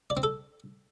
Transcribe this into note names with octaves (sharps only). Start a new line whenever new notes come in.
D5
C4
A4